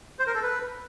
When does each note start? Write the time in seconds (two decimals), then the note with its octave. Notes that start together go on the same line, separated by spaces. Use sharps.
0.19 C5
0.27 A#4
0.35 A4
0.43 B4